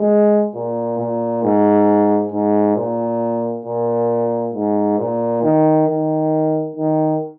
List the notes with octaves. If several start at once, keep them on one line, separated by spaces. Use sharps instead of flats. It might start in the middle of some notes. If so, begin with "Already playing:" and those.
Already playing: G#3
A#2
A#2
G#2
G#2
A#2
A#2
G#2
A#2
D#3
D#3
D#3